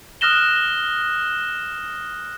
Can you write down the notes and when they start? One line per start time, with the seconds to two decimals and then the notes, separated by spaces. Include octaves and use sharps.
0.21 D#6 F6 F#6 A#6 E7 G7